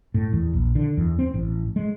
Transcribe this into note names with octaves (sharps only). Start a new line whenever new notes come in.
A2
E2
A#1
D3
E2
C4
A1
G#3